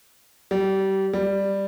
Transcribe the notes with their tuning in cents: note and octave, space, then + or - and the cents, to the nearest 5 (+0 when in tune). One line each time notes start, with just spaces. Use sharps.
G3 -25
G3 +5